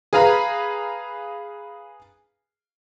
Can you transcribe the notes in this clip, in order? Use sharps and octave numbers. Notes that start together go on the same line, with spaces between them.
G#4 B4 F5 A#5 B5